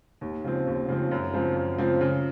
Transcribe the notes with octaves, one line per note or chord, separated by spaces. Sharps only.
D#2
C#3 F3 C4
D#2
C#3 F3 C4
F#2
C#3 F3 C4
F#2
C#3 F3 C4
C#3